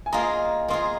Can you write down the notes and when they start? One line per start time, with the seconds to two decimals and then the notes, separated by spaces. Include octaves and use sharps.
0.06 G#5
0.12 A#3 F4 G#4 D#5 A#5
0.68 A#3 F4 G#4 D#5 C6